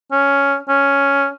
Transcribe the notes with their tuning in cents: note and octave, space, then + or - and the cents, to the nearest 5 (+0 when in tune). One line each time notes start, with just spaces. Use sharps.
C#4 +5
C#4 +5